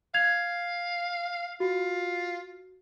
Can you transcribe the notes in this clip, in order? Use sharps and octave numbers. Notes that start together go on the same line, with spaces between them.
F5 G#6 F7
F4 F#4